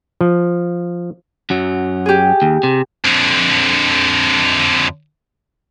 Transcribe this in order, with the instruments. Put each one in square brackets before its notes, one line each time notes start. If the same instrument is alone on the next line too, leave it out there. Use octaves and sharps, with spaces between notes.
[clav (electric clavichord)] F3
[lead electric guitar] F#2 F#3
[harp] G4 G#4
[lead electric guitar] D#2
C3
[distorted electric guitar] F2 D3